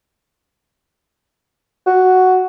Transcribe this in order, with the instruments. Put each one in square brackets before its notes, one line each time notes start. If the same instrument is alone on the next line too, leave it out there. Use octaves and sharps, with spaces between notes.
[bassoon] F#4